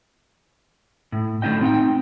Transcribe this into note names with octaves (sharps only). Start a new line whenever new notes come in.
A2
A2 D3 F#3 D#4 D#5 G5
C4 D#4 F5 G5